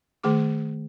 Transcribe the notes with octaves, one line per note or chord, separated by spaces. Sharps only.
D#3 A3 G#4 D6